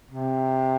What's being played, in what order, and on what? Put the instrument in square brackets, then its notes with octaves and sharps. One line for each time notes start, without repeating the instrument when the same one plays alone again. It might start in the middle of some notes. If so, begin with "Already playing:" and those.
[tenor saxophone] C3